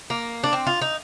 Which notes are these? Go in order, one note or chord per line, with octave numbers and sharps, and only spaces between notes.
A#3
D4
C4
F4
D#4